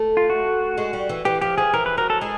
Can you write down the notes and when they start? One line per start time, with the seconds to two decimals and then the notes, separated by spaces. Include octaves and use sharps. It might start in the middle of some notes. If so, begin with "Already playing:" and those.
Already playing: A3
0.17 F4
0.30 F#4
0.78 G#3
0.93 G3
1.09 E3
1.25 E3 G4
1.41 F3 G4
1.58 F3 G#4
1.74 E3 A#4
1.86 B4
1.98 F#3 A#4
2.10 A4
2.21 G#3 G#4